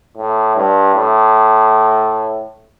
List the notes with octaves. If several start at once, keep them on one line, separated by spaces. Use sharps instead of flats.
A2
G2
A2